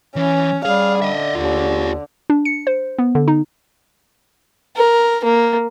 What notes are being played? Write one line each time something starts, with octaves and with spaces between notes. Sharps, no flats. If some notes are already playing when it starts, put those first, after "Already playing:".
E3 C#4
G3 G#4 F5
D3 D#5 E5
D#2 F4 G#4
D4
C#7
C5
B3
D3
D#4
A#4
A#3